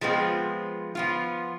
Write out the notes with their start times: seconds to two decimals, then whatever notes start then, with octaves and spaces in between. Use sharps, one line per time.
0.01 F3 G#3 B3 C4 F4
0.95 F3 B3 F4